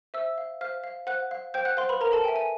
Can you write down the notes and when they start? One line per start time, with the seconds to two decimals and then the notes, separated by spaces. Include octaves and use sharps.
0.14 C5 E5 E6
0.38 F5
0.61 C5 F5 F6
0.84 F5
1.07 C5 F#5 F#6
1.31 F5
1.54 C5 G5 G6
1.65 F#5 F#6
1.77 C5 F5 C6
1.89 B4 B5
2.01 A#4 B4 A#5
2.12 A4 A5
2.24 G5 G#5
2.28 E5
2.36 G#5